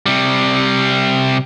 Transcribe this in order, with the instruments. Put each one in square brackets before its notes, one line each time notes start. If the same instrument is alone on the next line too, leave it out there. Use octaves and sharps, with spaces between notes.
[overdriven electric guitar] C3 G3